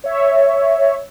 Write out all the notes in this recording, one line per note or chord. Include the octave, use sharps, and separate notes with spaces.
C#5 E5